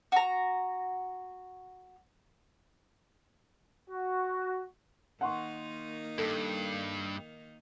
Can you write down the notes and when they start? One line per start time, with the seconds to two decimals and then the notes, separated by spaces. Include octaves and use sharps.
0.12 F#4 A#5
3.89 F#4
5.21 D#3 A#3 D#4 F#5 C6 C#6
6.18 G2 A4